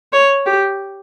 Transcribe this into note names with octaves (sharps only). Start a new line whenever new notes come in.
C#5
G4